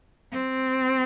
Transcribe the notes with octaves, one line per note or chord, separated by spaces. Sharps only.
C4